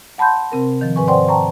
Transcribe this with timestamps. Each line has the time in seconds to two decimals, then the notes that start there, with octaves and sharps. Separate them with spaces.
0.18 F#5 A5 B5 C6 G6
0.52 C3 C4 A#4
0.81 D#3 F3
0.96 G#2 B4 G#5 C#6
1.08 C5 D5 F#5 G5 C6
1.28 G5 A5 A#5 C#6